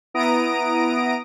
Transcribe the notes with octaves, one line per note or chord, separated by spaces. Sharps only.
B3 E4 A#5 D#6 A#6 D7